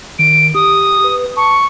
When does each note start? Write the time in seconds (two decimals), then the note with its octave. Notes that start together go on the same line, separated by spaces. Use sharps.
0.19 D#3 D7
0.55 G4 D#6
1.04 B4
1.37 A5 C#6